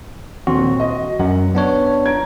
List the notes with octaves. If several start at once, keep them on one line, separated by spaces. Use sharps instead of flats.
D#1 C4 F#4 C6
D#5
F#2 F#5
B3 D4 C#5
A#5 G#6 D7